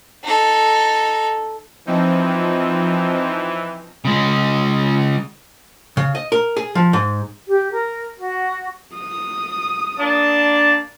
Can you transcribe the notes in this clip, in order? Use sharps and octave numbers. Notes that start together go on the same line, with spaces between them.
D#4 A4
E3 F3 C4 D#4
C#3 G#3
C#3
D#5
A#4
G#4
F3
G#2
G4
A#4
F#4
D#6
A#3 D4 A5